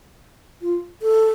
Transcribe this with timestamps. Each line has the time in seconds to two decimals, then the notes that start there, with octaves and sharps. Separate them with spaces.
0.62 F4
1.02 A4